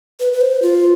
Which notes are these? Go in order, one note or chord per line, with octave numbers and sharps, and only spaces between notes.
B4
B4
C5
F4